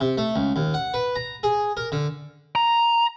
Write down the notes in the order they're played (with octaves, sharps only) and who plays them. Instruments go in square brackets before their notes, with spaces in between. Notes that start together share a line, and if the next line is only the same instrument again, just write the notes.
[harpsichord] C3
A3
C#2
D#2
F#5
B4
A#5
G#4
A#4
D3
[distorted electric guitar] A#5